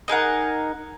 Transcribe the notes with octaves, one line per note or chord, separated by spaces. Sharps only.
D#4 G#4 A#4 F#5